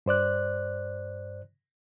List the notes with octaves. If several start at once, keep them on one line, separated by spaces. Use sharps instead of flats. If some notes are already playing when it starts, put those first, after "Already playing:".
G2 C5 D5 F#6